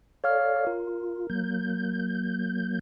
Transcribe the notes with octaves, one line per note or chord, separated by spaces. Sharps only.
A4 C#5 D5 F5 F6
F4 A#4
F#3 A#3 G6